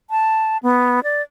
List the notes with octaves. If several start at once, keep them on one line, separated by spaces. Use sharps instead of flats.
A5
B3
D5